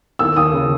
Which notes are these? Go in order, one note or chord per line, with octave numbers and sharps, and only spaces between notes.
D#2 E6
D#2 D#6
C#3